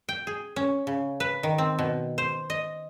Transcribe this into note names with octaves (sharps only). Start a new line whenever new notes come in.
G5
G#4
C#4
C#3
B4
D#3
C4
B2
C5
D#5